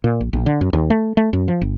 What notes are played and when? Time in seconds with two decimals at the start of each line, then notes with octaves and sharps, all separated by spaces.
0.04 A#2
0.21 A#1
0.33 A#1
0.46 D3
0.61 F#2
0.73 D#2
0.90 A3
1.17 A3
1.33 F#2
1.48 F3
1.61 G1